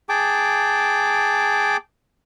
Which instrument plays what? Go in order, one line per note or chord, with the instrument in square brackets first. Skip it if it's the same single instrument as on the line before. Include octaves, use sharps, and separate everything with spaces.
[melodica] G#4 G5 A5 D6